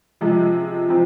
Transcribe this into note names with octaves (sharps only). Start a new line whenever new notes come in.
C3 F3 G#3
F3 C4